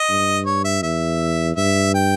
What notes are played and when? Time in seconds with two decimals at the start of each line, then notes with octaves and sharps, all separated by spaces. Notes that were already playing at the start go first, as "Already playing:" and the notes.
Already playing: D#5
0.09 G2
0.46 C#5
0.65 E5
0.83 E2 E5
1.57 G2 E5
1.94 G5